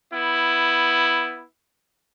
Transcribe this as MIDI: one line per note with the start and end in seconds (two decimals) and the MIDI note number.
0.13 1.45 59
0.13 1.45 64